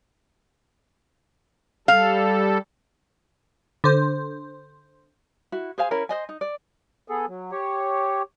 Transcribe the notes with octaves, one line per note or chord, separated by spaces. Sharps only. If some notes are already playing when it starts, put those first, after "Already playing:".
G3 A4 F5
D3 C5
E4 F#4
G#4 C5 F5 G#5
C#4 E4 A#4 C#5
C5 D#5 G#5
D#4
D5
B3 G#4 A4
F#3
G4 C#5